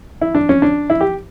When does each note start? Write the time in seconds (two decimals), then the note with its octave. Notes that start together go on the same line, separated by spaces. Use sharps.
0.21 E4
0.35 D4
0.49 C#4
0.62 D4
0.90 E4
1.01 G4